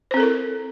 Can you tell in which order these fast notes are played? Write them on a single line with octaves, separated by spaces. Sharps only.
C5 C4 A4 A#4 E4